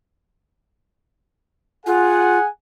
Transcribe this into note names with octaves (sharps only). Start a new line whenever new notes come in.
F4 G#4 F#5 G#5